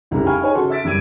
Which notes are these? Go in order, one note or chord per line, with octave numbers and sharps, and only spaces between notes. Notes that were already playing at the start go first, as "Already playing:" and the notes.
F1 C2 C#3 G3 A3 A#5
F5 G5 G#5 B5 C#6 F6
D#4 G#4 B4 C#5 G#5
C#3 F#4 A4 F#5 C6
E5 E6 A6 B6 D7
F#1 G2 E6 G#6 D7 D#7